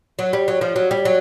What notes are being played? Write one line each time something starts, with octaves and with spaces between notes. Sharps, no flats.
F#3
G3
F#3
F3
F#3
G3
F#3